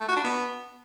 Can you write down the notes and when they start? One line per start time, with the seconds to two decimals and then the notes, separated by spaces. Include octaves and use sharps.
0.01 A3
0.09 F#4
0.16 D4
0.24 B3